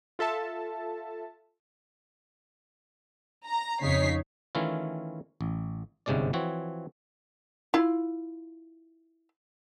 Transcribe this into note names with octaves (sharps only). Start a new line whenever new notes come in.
F4 A4 E5 A5
A#5
F2 C#3 D#4 C#5 B6 C7
D#3 E3 A3 C#4 E4 F4
A1
G1 G#2 C3 G#3 C#4 D5
E3 F3 C4 F#4 C#5
E4 F4